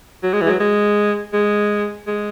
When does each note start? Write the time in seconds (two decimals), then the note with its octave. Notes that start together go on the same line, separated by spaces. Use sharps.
0.23 F#3
0.33 G#3
0.41 E3
0.47 G#3
0.50 F#3
0.60 G#3
1.34 G#3
2.07 G#3